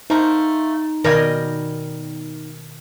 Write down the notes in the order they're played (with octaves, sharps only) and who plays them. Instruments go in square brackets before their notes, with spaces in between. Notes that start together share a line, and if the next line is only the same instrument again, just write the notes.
[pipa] A3 A#3 [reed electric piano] D#4 A#5 [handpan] C5
[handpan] B2 D#3 [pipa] G3 D5 G#5 [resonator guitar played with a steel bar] A#4 D#5